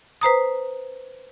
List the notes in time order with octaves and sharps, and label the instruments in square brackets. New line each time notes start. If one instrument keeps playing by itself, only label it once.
[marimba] B4 C5 A#5 D#6